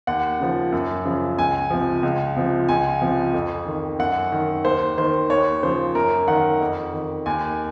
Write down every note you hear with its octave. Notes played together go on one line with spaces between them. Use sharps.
D#2 F#5
C#3 F3
F#2
C#3 F3
C#2 G#5
C3 F3
C#2
C3 F3
C#2 G#5
C3 F3
F2
D#3
F#2 F#5
D#3
D#2 C5
D#3 C5
D#2 C#5
C#3 F3 C5
F#2 A#4
D#3 F#5
F2
D#3
D#2 G#5